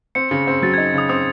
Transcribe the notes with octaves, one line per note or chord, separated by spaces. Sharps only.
C4 C#7
C#3
C4
F#3 A6
G#6
D#4
C#3 D#6
C4 D#6